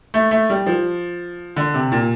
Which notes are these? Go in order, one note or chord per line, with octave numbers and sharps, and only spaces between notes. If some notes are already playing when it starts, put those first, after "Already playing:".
A3
A3
G3
F3
D3
C3
A#2